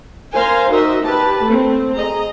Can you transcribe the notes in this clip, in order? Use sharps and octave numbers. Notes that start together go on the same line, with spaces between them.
A#4 C5 F5 G#5 A#5 C6
D#4 F#4 A#4 C5 D#5 E5
G4 B4 A5
A3 C4
G#4 D#5 A#5